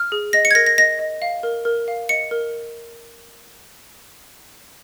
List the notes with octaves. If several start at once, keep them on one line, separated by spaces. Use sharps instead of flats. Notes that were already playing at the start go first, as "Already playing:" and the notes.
Already playing: F6
G#4
D#5 A#6
C#7
G#6
A#4 A#6
A#6
D#5 A#6
D#5
F5
A#4
A#4
F5
D#5 C#7
A#4